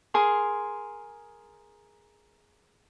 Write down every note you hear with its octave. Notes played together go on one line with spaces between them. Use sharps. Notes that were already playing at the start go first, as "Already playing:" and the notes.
G#4 A#4 C6